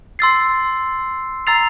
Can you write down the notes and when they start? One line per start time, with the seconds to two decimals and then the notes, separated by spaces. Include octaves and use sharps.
0.19 C6 E6 A6 C7
1.47 A#5 E6 A6 C7 F7